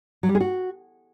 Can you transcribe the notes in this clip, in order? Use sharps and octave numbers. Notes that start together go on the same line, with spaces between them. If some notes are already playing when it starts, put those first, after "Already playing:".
F#3
G3
G#4
F#4